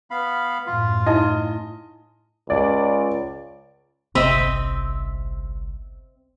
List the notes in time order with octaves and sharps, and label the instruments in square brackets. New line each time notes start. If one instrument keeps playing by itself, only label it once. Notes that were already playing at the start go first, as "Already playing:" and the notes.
[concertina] B3 F5 B5
[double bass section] F#2 A2 [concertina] F4
[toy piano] D#4 E4 [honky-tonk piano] D#5
[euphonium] C#2 [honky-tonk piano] D5
[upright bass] G1 C2 [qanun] C4 D#5 E5